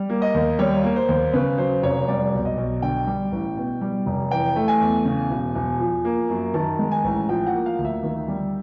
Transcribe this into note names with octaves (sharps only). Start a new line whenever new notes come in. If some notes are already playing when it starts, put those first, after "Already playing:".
Already playing: G3
A#3
D#5
D#2
G3 C#5
A#3
C5
D#2
C#3 B4
F#3 C5
F1 C#5
G3 D5
B1
D#5
B1
D3 G5
G3
A1
B2
G3
F1
E3 G5
A3
G#5
E2
C#3
E1
E1
F3
A#3
F#2
D#3 A5
G#3
G#5
A1
F3 G5
F#5
A#3
F5
D2
E5
D#3
G3